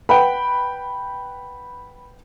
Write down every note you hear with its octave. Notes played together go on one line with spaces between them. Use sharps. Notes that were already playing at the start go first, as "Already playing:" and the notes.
B4 F#5 G5 B5